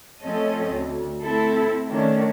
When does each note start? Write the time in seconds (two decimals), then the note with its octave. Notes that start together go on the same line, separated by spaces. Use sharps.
0.21 F3 A3 C4 C#4 A4 D#5
0.70 D2
1.21 A3 C4 E4 A4
1.88 D#3 A3 C#4 D4